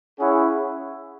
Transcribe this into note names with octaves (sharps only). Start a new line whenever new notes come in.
C#4 E4 G#4 C#5 F#5